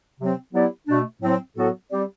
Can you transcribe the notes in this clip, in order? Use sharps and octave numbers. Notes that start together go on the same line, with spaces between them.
C3 F#3 C4
F#3 B3 E4 G4 D5
B2 A3 D4
A2 F#3 C4
A2 F#3 B3 F#4 A4
G3 C4 G4 D5